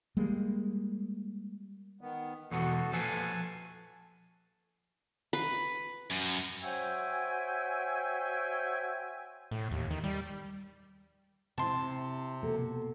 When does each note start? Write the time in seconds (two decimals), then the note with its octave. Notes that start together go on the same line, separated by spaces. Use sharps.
0.17 G3 G#3 A#3
2.01 D#3 B3
2.51 E2 B2 B3 F#4 A4
2.93 F3 A4 B4 G#5 A5
5.33 B4
6.11 F#2
6.62 F#4 C5 C#5 E5 G5 G#5
9.51 A2
9.71 D#2
9.90 D#3
10.04 G3
11.58 C3 C4 E4 A5 C6
12.43 B2 A#3 A4